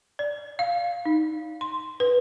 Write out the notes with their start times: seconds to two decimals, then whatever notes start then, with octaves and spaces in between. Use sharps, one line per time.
0.19 D5
0.59 F5
1.05 D#4
1.61 C6
2.00 B4